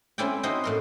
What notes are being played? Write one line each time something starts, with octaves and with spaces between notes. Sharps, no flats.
C4 C#4 E4 D5 G5
C4 D#4 E4 F#4 C5 D#5
A2 A#4 C6